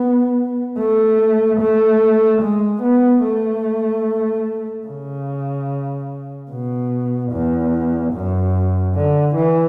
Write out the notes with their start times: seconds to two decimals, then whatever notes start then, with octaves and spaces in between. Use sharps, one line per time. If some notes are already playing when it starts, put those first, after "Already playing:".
Already playing: B3
0.79 A3
1.60 A3
2.42 G#3
2.82 B3
3.24 A3
4.87 C#3
6.51 B2
7.32 E2
8.13 F#2
8.95 D3
9.35 E3